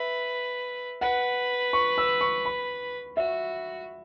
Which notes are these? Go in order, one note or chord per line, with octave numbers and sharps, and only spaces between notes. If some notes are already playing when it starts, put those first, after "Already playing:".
Already playing: B4 E5
B4 F#5
C#6
E6
C#6
B5
F#4 E5